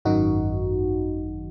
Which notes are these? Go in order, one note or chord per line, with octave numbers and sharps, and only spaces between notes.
G#1 F#2 D#3 D#4 F#4